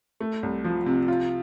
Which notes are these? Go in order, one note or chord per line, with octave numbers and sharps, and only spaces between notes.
A3
C2
F3
C3
F4